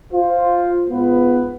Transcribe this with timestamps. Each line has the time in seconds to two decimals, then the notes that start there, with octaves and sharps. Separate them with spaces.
0.13 F4 C5
0.90 G#2 B3 F4 B4